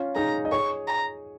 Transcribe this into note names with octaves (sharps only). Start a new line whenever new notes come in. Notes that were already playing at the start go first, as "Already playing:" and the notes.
Already playing: C#4 F4
D#4 G#4 A#5
D#5
G#4 C#5 C#6
A#5